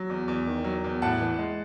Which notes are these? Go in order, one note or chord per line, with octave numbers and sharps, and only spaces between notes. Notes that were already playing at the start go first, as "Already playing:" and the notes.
Already playing: F#3
E2
E2
D#3
F#3
E2
A2 F#5 A5
E3
G#3